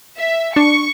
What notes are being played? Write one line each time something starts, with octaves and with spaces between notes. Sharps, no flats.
E5
D4 C#6